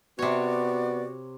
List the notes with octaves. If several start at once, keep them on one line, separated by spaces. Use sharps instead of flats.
C3 B3 F#4 C#5 D5